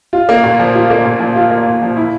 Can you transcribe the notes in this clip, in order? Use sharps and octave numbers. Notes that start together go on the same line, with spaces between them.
F4
A#3
A#2
F3
F4
A#3
A#2
F3
F4
A#3
A#2
F3
E4